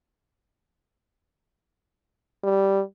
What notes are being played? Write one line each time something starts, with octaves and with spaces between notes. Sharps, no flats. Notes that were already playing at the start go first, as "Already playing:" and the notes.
G3